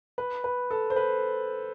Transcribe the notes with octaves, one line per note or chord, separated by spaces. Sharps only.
B4
B4
A4
C5
B4